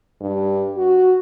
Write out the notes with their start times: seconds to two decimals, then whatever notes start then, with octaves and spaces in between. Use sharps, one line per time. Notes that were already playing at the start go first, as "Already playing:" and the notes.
0.21 G2
0.77 F#4